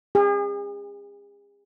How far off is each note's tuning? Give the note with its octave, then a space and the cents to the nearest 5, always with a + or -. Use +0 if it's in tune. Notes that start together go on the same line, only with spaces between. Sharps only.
G#4 -40